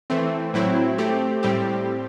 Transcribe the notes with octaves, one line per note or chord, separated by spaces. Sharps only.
E3 A3 C4
A2 F#3 C4 E4
A3 C4 G4
A2 G3 C4 G4